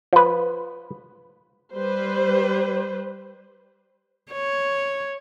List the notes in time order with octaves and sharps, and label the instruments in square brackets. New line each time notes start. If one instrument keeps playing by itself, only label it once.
[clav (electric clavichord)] F3 B4
[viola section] G3 B4 C5
[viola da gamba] C#5